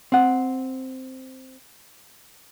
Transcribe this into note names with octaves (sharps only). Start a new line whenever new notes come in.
C4 F#5